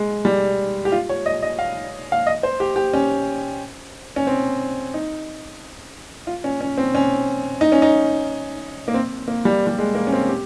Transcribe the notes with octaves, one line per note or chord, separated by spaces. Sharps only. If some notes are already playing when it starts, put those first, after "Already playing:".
Already playing: G#3
G3
G4
F4
C#5
D#5
D#5
F5
F5
D#5
C5
G4
G4
C#4
C#4
C4
D#4
F4
C#4
C#4
C4
C#4
D#4
C#4
D#4
A#3
C4
A#3
G3
G3
G#3
A#3
C#4
C4
G4